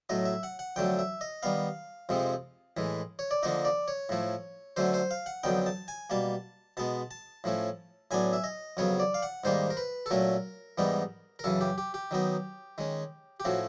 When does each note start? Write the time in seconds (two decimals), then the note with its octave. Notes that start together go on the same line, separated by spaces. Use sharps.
0.09 A2 F#3 A3 D#5
0.25 E5
0.43 F#5
0.59 F#5
0.76 F2 D3 F#3 A3 G5
0.99 E5
1.21 D#5
1.43 D#3 G3 B3 F5
2.09 F2 C3 F3 G#3 C4
2.77 A2 E3 G#3
3.19 C#5
3.31 D5
3.43 D3 F3 A#3 D#4 D#5
3.65 D5
3.88 C#5
4.09 A2 F3 A3
4.76 D3 F#3 A3 C#4 C5
4.94 C5
5.11 F5
5.26 F#5
5.43 F2 D3 F#3 B3 D#4 G5
5.66 A5
5.88 G#5
6.10 B2 G3 A#3 A5
6.77 B2 G#3 B3 A5
7.11 A5
7.44 A2 F3 A3 C#4
8.11 A2 F#3 B3 D4 G#5
8.33 E5
8.44 D#5
8.77 F2 C#3 F#3 B3 C#5
9.00 D5
9.14 F5
9.23 F#5
9.44 G#2 D#3 G3 A#3 C5
9.70 A#4
9.77 B4
10.06 A4
10.11 A#2 F#3 A3 C#4 A#4
10.78 G#2 E3 G3 B3 D#4
11.39 A#4
11.44 F#2 C#3 E3 A4
11.61 G4
11.78 G4
11.94 G4
12.11 D#3 F#3 B3 D#4
12.78 D#3 G#3 C#4
13.40 G4
13.45 A2 F3 A3 C#4 F#4